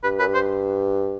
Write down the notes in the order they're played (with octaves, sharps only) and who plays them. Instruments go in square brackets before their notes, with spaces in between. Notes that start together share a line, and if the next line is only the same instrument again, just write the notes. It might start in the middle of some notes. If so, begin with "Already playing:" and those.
[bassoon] G2 [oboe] B4
[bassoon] F#2 [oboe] B4
[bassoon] G2
[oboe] C5